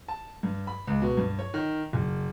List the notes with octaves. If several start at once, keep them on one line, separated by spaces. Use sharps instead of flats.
A5
G2
B5
C#2
B2
G2
C#5
D#3
F#1